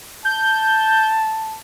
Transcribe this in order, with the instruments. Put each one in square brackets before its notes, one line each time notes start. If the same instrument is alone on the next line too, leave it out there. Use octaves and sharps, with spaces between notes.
[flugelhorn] A5 [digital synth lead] G6